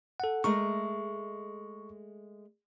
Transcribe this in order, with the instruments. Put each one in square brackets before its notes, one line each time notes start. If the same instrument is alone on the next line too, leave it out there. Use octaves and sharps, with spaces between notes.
[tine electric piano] A4 F#5
[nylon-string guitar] G#3 A3 A#4 [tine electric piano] C#6